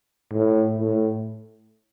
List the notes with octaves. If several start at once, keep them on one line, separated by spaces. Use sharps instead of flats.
A2
A2